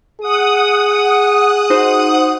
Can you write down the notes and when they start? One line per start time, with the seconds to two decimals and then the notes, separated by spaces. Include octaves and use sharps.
0.20 G#4 F#5 D#6
1.70 D#4 F#4 C5